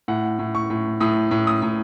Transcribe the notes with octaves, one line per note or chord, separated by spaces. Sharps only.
A2 F#5
A2
C#6
A2
A2 D#6
A2
D#6
A2